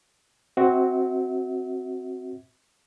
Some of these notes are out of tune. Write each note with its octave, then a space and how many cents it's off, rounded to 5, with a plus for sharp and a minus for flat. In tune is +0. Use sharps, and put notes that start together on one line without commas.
C4 +0 F#4 +0 E5 -35